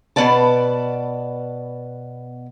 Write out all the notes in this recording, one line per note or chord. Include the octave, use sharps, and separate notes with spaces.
B2 A3 B3 B4 D5 A5